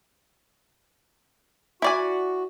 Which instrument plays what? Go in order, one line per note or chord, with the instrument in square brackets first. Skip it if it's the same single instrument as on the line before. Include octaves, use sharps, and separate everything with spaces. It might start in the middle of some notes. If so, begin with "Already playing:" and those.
[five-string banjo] E4 D5 G#5 [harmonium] F#4